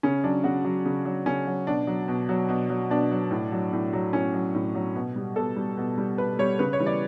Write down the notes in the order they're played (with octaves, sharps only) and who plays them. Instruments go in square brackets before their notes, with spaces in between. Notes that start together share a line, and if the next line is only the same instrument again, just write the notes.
[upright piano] C#3 C#4
F#3 D4
C#3 F#4
F#3
C#3
F#3
C#3 C#4
F#3
B2 D4
F#3
B2
F#3
B2
F#3
B2 D4
F#3
A2
F#3
A2
F#3
A2 C#4
F#3
A2
F#3
B2
G3
B2 A4
G3
B2
G3
B2 B4
G3 C#5
C#3 B4
C#5
E3 G3
D5